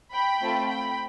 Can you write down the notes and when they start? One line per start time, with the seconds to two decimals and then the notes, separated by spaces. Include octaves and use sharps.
0.13 G5 B5
0.41 A3 C4 F4 A4
0.69 G5 B5